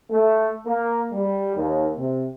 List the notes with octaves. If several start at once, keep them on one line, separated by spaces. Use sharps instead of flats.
A3
A#3
G3
D#2
C3